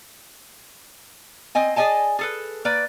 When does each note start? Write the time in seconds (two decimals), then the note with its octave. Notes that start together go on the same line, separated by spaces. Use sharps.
1.55 C4 D#5 G#5
1.76 G#4 D5 D#5 G#5 A5
2.19 G#4 A4 B4
2.65 A#3 B4 D5